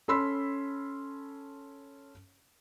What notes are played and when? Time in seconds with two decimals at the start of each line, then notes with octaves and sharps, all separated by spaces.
0.08 C#4 A4 B5 C6 E6 B6